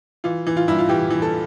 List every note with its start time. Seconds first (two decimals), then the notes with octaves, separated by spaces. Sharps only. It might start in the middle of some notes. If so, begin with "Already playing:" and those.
0.24 E3 F4
0.47 E3
0.57 F4
0.68 G2 E4
0.79 F4
0.89 E3 G4
1.10 E3
1.22 A4